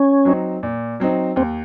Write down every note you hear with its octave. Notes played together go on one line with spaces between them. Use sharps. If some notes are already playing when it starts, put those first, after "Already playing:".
Already playing: C#4
F#3 C4 D#4
A#2
F#3 C4 D#4
D#2 C4